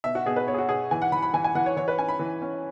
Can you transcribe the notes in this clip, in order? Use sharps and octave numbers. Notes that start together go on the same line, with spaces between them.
B2 E5
F#4
B2 G#4
B4
B3 C#5
G#4
F#4
B2 G#4
E3 G#5
F#5
E3 B5
B5
E3 G#5
G#5
E3 F#5
C#5
E3 C#5
B4
C#4 G#5
B5
E3
C#4